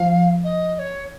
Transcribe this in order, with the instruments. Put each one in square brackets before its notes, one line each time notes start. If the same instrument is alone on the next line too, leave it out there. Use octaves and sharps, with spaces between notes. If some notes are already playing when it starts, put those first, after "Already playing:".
Already playing: [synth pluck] F3 [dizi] F5
[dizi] D#5
D#5
C#5